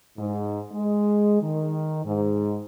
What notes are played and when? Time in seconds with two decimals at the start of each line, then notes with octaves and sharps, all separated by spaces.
0.18 G#2
0.72 G#3
1.41 D#3
2.04 G#2